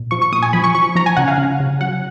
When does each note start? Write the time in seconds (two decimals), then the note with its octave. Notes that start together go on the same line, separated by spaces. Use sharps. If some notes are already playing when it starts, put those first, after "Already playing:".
Already playing: A#2
0.11 F3 C#6
0.22 C#6
0.32 A#2 D#6
0.42 G#5
0.53 F3 B5
0.64 C#6
0.75 F3 C#6
0.95 F3 A#5
1.06 G#5
1.17 C#3 F#5
1.28 F5
1.38 C#3
1.60 C#3
1.81 F#3 F#5